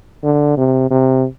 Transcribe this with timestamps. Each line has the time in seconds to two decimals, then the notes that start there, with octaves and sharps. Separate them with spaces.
0.24 D3
0.57 C3
0.91 C3